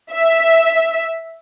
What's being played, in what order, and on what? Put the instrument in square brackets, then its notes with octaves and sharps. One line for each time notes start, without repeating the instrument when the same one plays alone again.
[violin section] E5